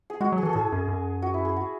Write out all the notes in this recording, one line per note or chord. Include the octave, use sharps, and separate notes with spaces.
G#4
G#3 F#4
F#3
G#4
E3 A4
A2 G#4
F#2
F#2
F#4
E4
G#4
F#4